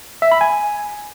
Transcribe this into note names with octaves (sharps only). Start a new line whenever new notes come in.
E5
B5
G#5